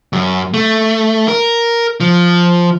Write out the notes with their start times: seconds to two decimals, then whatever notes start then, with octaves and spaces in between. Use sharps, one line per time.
0.13 F#2
0.54 A3
1.28 A#4
2.00 F3